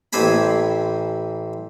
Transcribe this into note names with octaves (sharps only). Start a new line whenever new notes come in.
A1 C4 C5 G#5 B5